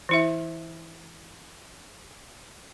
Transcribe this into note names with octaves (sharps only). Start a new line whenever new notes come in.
E3 E4 E5